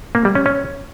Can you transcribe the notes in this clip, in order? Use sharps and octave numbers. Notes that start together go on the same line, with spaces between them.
A#3
G3
C#4
C#4